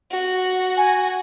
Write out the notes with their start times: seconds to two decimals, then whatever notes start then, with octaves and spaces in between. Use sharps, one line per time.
0.11 F#4
0.77 G#5